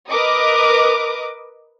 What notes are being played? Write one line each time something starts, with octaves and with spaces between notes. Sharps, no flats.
A#4 B4 D#5 D6 D#6